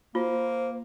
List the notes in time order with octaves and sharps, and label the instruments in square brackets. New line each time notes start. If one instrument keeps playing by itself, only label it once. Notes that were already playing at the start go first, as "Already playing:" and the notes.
[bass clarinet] A#3 [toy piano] F4 [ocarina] C5